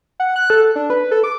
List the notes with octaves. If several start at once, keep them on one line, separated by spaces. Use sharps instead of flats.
F#5
F#6
A4
D4
B4
A4
D6